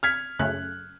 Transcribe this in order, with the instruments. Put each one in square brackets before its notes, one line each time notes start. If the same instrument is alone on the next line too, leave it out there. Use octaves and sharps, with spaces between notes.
[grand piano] F6 G#6 B6
[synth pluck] F#2 C#3 A3 [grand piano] F#6